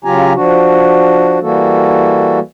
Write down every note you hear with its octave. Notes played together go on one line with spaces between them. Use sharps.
C#3 F#3 F4 G4 G#5 A#5
F3 D4 F#4
E3 G3 A#3 F#4 A4